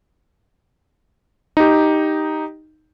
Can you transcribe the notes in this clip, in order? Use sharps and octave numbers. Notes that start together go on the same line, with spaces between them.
D#4 G4